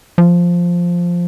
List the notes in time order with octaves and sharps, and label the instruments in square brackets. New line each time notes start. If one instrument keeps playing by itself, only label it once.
[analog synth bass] F3